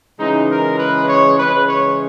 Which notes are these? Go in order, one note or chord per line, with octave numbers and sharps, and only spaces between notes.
C#3 E3 G#3 D#4
A#4
B4
C#5
C#3 E3 G#3 B4
C#5